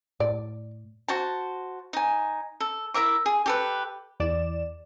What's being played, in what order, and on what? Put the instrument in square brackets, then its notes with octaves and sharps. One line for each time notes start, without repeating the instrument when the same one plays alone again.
[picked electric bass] A2 [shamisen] D5
[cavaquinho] F#4 C5 A5
D#4 G#5
A4
E4 A#4 E5 D6
G#4
G4 A4 B4
[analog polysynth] E2 D5 E7